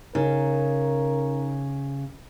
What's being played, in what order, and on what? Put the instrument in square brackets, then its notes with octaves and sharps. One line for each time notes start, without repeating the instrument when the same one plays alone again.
[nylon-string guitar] C#3 [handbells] D#4 [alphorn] A#4